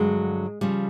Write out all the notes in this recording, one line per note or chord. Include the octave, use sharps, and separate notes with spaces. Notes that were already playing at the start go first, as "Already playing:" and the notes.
Already playing: G2 D3 F#3 G#3
C#3 F3 G3